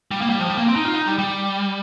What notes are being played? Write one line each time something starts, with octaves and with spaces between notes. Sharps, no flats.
G3
A#3
G3
F3
G3
A#3
C4
D#4
F4
D#4
G3
G3